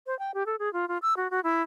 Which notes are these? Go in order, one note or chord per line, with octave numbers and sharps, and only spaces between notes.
C5
G5
G4
A4
G#4
F4
F4
E6
F#4
F#4
E4